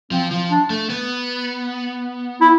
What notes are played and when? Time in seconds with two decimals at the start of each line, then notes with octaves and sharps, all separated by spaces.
0.11 F3 C4
0.31 F3
0.50 D4
0.70 A3
0.90 B3
2.41 E4